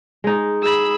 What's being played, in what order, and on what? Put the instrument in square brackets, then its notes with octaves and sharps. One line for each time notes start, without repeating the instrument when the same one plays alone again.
[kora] G#3 D#4
[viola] G#4 [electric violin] B5 E6